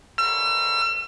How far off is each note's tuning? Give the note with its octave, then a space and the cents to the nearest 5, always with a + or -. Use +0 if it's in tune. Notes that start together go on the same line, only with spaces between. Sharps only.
E6 +40